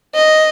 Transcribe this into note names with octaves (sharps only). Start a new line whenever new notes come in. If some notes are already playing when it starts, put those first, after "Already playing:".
D#5